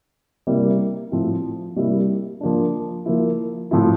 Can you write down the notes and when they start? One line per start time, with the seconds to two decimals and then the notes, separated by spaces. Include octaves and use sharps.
0.47 C3 G3 A#3 E4
1.12 A2 F3 C4 E4
1.76 C3 G3 A#3 E4
2.41 F3 A#3 D4
3.06 F3 A#3 E4
3.71 A2 F3 C4 E4